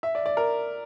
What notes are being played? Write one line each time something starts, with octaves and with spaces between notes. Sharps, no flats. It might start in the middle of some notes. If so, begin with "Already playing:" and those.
E5
D5
D5
A#4